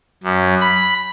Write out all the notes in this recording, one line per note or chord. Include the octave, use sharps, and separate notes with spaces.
F#2
B5